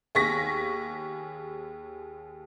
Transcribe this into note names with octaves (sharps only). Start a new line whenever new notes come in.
D#2 G#4 C#6 A#6 B6